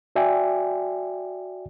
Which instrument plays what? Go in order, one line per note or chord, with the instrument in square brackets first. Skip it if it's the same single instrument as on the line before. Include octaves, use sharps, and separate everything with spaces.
[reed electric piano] F#4 D5 E5 G5 G#5